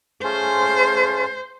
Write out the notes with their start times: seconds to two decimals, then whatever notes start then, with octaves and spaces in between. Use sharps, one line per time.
0.24 A3 C#4 F4 G#4 C5